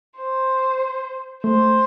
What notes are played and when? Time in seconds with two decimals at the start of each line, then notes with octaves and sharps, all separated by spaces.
0.20 C5
1.44 A3 C5